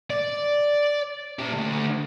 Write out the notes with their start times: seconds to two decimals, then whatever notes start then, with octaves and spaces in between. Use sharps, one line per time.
0.10 D5
1.39 A#2 G4
1.54 D2